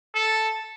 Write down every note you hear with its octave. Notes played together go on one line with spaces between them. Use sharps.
A4